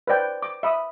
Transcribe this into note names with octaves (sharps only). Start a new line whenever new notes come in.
B4 C5 D5 G5
D6
E5 B5 D#6